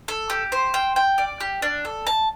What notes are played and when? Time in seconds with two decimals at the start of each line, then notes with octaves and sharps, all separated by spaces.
0.08 A4
0.30 G4
0.52 C5
0.74 G5
0.96 G5
1.18 D5
1.40 G4
1.62 D4
1.85 A4
2.07 A5